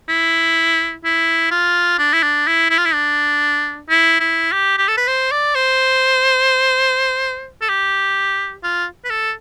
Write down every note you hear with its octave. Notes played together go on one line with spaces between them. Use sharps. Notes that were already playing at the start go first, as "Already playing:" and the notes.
E4
E4
F4
D4
E4
D4
E4
E4
F4
E4
D4
E4
E4
G4
G4
A4
B4
C5
D5
C5
A4
G4
F4
B4
A4